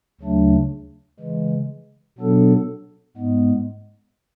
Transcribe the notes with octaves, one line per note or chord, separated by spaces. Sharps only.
D2 C#3 F#3 A3 D4
C#3 E3 G#3
B2 F#3 B3 D4 A4
G#2 G#3 B3